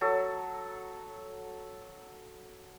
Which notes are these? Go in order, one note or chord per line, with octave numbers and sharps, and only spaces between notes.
F#3 A4